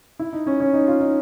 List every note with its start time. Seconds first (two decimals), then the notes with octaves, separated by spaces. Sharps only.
0.19 E4
0.33 D#4
0.46 C#4
0.60 C#4
0.74 D#4
0.87 F4
1.01 D#4